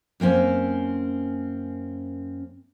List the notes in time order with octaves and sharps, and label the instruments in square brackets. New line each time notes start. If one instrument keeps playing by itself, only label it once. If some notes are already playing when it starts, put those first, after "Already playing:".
[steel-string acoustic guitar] F#2 A#3 C4 C#4